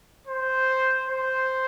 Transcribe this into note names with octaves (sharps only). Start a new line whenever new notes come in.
C5
C5